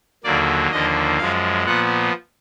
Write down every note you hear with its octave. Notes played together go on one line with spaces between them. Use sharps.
D#2 D3 F#3 A#3 D5
D#2 D3 F3 A#3 D#5
F#2 F3 G#3 F5
A#2 F3 B3 F#5